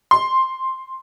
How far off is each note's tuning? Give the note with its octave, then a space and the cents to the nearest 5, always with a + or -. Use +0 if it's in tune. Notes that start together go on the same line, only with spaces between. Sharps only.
C6 +5